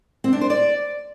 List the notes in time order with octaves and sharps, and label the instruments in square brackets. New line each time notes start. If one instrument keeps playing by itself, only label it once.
[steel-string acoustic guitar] C4
D4
C5
D5